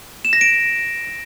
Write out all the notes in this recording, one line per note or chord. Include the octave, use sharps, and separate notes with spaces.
E7
A#6
D7